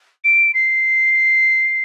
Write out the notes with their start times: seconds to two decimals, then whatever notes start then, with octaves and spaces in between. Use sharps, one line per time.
0.24 D7
0.54 C7